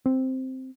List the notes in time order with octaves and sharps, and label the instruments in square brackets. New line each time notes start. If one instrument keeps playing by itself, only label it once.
[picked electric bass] C4